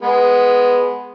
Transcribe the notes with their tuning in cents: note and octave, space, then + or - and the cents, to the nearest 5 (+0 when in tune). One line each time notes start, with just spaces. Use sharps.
G#3 +0 B3 +0